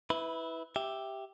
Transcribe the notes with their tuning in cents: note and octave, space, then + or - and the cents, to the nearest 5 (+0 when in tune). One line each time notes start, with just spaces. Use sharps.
E4 -15 B4 +10
G4 +0 E5 +0